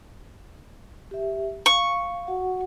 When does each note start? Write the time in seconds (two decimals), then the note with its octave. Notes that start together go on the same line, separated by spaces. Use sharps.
1.11 G4 E5
1.66 F5 C#6
2.27 F#4 F#5